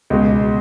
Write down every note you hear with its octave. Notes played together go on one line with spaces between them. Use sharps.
C#2 B2 G#3